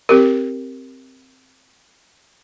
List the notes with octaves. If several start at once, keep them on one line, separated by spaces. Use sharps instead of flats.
C4 G4 A#4